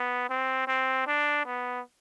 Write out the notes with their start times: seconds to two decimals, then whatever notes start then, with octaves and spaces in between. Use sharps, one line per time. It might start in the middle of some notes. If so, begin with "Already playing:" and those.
Already playing: B3
0.30 C4
0.67 C4
1.07 D4
1.46 B3